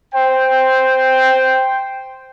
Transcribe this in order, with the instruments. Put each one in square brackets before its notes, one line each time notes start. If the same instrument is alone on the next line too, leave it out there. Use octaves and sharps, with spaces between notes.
[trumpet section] C5 G5